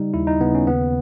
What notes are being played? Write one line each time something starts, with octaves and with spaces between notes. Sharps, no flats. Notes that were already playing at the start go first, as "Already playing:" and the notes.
Already playing: C#3 G3 D#4
D#2 E4
D#4
C#3 B3
C#4
D#2 B3